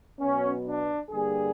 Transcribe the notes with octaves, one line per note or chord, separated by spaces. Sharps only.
B2 F#3 B3 C#4
D4
G2 D3 G3 A#3 G#4